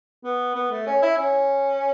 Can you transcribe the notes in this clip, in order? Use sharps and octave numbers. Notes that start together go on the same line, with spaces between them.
B3
B3
A3
C#4
E4
C#4